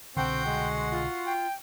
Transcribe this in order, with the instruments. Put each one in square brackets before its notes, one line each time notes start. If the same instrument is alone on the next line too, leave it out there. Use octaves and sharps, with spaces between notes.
[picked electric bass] C2 B2 D3 [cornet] C4 [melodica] F#4 F#5 C6 [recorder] G5
[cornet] G#3
[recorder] F4
[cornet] G5